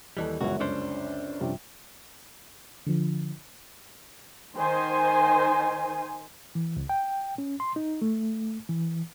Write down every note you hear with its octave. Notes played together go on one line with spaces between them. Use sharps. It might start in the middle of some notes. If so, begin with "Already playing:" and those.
D#2 E3 G3 A4 D#5
G1 C#2 F#2 E3 F#4
C#4 D4 C5
G2 C3 F3
D3 F3
D#3 C5 G#5
E3
C#2
G5
C#4
C6
D#4
A3
E3